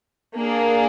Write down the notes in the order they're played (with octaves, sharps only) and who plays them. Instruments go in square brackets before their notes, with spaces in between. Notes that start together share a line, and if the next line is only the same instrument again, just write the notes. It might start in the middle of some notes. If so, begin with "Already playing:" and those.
[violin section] A#3 D4 G#4